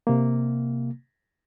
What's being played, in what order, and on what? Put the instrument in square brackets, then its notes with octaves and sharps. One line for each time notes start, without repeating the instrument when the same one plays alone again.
[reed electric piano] C3 A#3